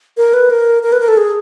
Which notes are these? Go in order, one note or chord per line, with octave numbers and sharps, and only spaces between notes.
A#4
B4
A#4
A#4
B4
A#4
A4
G#4